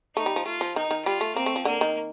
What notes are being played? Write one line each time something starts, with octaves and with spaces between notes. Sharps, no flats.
A3 D#4
G3
F3
A3 F4
F3
D#3 D#4
D#3
G3 F4
A3
A#3 C4
A3
F3
D3 A#3
D#3